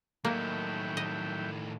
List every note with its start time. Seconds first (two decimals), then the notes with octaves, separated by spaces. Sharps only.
0.25 A2 D#3 F#3 A#3 E5 G5
0.97 D#5